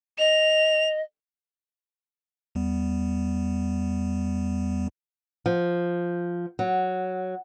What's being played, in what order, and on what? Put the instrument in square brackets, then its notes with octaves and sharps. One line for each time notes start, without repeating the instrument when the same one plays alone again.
[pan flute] D#5 [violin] F7
[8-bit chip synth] E2 G3 B3
[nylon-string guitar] F3
F#3